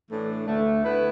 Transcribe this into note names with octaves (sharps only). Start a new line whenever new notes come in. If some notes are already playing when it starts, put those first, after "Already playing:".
A2 E3 A3 D4
D2 D3 A3
D3 B3 E4 B4